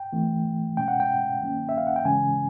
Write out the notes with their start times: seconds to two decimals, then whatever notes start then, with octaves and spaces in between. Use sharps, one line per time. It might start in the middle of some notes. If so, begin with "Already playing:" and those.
Already playing: G5
0.13 E3 A3 C4
0.77 B2 G#3 C#4 G5
0.88 F#5
1.00 G5
1.41 D#3 F#3 A#3 C#4
1.69 E5
1.78 F5
1.87 F#5
1.96 G5
2.05 C#3 E3 G#3 C#4 G#5